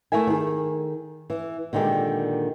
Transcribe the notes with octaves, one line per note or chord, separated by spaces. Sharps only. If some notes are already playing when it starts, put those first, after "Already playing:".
A3 E4 A#4 E5 G#5
D#3 G#4
E3
A#2 D3 D#3 G#3 G4